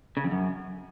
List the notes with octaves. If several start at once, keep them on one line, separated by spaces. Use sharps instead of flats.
C#3
F2
F#2